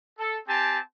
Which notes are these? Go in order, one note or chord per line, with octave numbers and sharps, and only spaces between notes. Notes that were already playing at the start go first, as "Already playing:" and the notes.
A4
C4 G4 G#5 A5